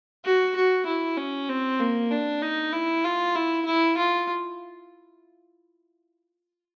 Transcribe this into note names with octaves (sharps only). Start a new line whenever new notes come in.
F#4
F#4
E4
C#4
C4
A#3
D4
D#4
E4
F4
E4
E4
F4